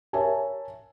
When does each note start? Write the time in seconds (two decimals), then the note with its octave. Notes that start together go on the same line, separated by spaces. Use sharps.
0.13 A#4 C#5 E5 G#5 A5